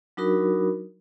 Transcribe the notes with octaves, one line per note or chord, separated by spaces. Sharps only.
F#3 D4 D#4 F#4 A#4 B5